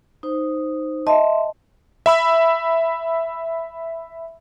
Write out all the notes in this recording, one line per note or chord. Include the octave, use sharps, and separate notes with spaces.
D#4 C5
D#5 E5 A5 C6
E5 B5 E6